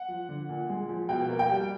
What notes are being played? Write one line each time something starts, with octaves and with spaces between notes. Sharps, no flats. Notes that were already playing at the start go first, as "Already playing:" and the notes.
Already playing: F#5
F3
D3
A#2
G#3
F3
B2 G5
A#3
G5
G3